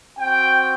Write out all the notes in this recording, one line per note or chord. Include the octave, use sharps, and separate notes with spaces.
C4 F#4 G5